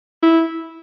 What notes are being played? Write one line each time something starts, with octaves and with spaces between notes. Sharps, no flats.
E4